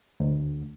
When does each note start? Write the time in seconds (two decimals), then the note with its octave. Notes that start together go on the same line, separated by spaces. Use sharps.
0.20 D2